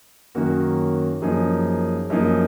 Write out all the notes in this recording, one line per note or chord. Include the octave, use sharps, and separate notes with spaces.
F#2 D#3 A#3 C#4 F#4
F#2 F3 A#3 D#4 G#4
F#2 F3 A#3 D#4 G#4